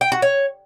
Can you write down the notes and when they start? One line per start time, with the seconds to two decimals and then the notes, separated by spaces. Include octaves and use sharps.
0.01 G5
0.12 F#4
0.22 C#5